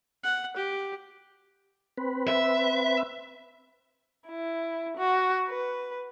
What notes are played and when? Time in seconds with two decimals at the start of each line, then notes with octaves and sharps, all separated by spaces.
0.24 F#5
0.57 G4
1.98 C4 B4
2.28 E5
4.27 E4
4.97 F#4
5.49 B4